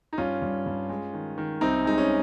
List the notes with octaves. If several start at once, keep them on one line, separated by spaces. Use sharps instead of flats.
D#4
G2 C#4 F4
G2
G2
G#3
D#3
D#3
C2 C4 D#4
G#3 D#4
C#4